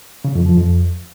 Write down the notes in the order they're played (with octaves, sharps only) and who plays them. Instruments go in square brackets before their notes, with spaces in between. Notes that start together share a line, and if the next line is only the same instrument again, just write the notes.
[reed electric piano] C#3
F2
F3
F2